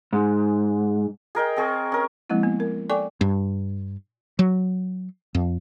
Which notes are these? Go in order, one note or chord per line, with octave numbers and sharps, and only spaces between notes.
G#2
G#4 A#4 D#5 G5
C4 G#4 C#5
C#4 A#4
F3 G#3 A#3 C4 E4
B3
A#4
A4 D5 G5 G#5 C#6 D6
G2
F#3
F2